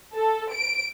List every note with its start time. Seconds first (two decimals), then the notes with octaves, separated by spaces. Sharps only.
0.14 A4
0.52 D7